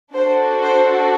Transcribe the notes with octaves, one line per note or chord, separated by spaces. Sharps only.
D4 F#4 A4 C5
C5